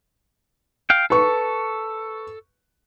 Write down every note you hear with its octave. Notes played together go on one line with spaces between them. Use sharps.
F5 G5
A4 B4 C#6